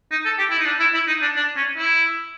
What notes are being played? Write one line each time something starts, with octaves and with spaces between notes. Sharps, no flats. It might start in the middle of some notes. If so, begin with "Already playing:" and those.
D#4
A4
G4
E4
D#4
D4
E4
E4
D#4
D4
D4
C#4
E4